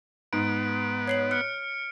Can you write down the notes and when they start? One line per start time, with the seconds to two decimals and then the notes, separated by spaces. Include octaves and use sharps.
0.33 G#2 B3 D7
1.08 C#5 C7 F#7
1.31 F6 F#6 C#7